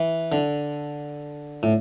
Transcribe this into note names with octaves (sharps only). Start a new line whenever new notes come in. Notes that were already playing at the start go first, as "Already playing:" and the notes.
Already playing: E3
D3
A2